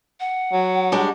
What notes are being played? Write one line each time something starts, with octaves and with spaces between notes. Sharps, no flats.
F#5
F#3
G3 G#3 D4